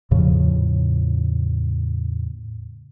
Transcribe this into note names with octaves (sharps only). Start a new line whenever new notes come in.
E2 A2 C#3 F3